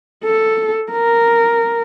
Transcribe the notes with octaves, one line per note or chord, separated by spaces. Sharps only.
A4
A#4